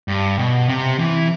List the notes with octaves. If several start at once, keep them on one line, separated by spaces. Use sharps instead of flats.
G2
B2
C3
E3